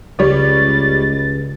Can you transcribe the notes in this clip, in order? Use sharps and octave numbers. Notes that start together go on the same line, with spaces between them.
C#2 G3 C#5 D5 A6